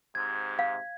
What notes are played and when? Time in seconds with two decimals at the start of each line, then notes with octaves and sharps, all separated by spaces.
0.15 G#2 C3 G#6
0.59 F5